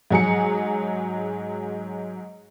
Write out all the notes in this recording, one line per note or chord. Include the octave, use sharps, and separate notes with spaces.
G#2 F#3 G#4 C#7